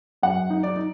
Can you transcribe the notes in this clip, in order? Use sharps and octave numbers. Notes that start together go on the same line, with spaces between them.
F#2 F#5
D#4
D5
D#4